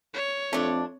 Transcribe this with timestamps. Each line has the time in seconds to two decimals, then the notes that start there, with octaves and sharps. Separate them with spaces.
0.14 C#5
0.53 F2 A3 C4 D4 D6